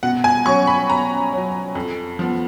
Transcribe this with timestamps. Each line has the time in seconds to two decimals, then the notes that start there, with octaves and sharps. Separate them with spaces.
0.03 B2 F#5
0.24 G#5
0.46 F#3 C#4 C#6
0.67 B5
0.90 B2 A#5
1.32 C#4
1.38 F#3
1.75 F2
2.19 F3 B3